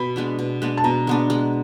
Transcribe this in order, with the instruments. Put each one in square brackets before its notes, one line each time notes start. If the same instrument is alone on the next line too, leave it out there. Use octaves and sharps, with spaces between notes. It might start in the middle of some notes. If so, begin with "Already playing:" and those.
Already playing: [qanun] B2 [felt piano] B5
[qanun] G#3 B3 D4
B2
G#3 B3 D4
[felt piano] A5
[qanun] B2 [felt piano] A#5
[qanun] G#3 B3 D4
G#3